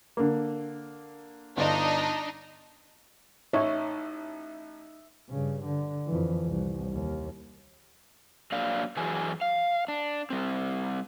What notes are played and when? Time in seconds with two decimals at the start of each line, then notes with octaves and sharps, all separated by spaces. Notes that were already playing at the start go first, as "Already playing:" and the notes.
0.17 D3 A#3
1.57 G1 D4 D#4 D#5
3.53 A1 D#4 C#5 E5
5.29 G2 C#3
5.65 D3
6.07 F2 E3
6.47 C2
6.93 D#2
8.52 F#3 A#3 D4 D5 F5
8.97 F#2 E3 F#3 G#4 G#5
9.41 F5
9.88 D4
10.30 G3 C4